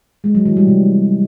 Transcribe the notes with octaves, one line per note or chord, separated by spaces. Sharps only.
G#3
F#3
E3
G3
C3